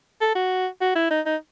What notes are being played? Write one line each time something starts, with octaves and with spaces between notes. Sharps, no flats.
A4
F#4
F#4
E4
D#4
D#4